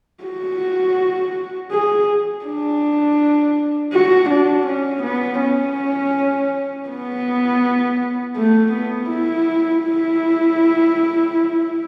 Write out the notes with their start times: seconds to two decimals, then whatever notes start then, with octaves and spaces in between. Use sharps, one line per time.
0.23 F#4
1.72 G#4
2.45 D4
3.93 F#4
4.30 D4
4.67 C#4
5.03 B3
5.40 C#4
6.88 B3
8.36 A3
8.72 B3
9.09 E4
9.84 E4